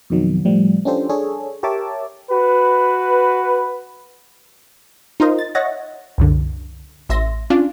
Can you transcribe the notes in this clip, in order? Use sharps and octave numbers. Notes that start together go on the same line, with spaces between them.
F2 B2 D#3 F#3
A2 F3 G3
C#4 D4 F4 G4 A4 C5
D4 G#4 A4 C#5
G4 A#4 C#5 E5 A5 D6
F#4 B4
D#4 F4 A#4 C5 D#5
A6
C#5 D#5 E5 F#5 A6 A#6
C2 F#2 D3
A1 E5 C6 A#6
C#4 D4 F4 F5